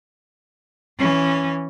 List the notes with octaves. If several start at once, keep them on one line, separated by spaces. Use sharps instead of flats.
E3 C#4